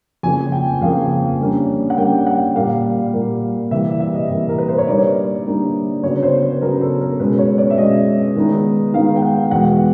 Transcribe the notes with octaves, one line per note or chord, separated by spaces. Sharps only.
F2 C#3 F3 A#3 G#5
G5
F2 C#3 F3 A#3 F5
D3 G3 A#3 C#4
F#5
D3 G3 A#3 C#4 G5
F#5
A#2 G3 A#3 F5
A#2 G3 A#3
C3 E3 G3 A#3 E5
E5
D#5
C3 E3 G3 A#3
A#4
B4
C5
C#5
D3 G3 A#3 D#4 D5
D3 G3 A#3 D#4
C#3 F#3 B3 D4 C#5
C5
B4
C#3 F#3 B3 D4 A#4
A4
A#4
B2 G#3 C#4 B4
C#5
D5
E5
B2 G#3 C#4 D#5
D#3 G#3 B3 D#4
D#3 G#3 B3 D#4 F5
G5
F#5
E2 B2 G#3 F#5